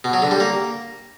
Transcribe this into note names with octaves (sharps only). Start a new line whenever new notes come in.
B2
F#3
D3
G3
A#3